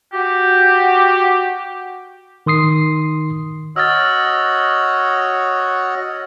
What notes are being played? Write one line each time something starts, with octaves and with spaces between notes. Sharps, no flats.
F#4 G4
D#3 C6 D#6 C7
F#4 C#5 D#5 E6 F6 A6